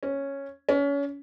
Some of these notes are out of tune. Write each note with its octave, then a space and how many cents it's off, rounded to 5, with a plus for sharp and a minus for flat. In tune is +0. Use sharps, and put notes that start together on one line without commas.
C#4 -5
C#4 +30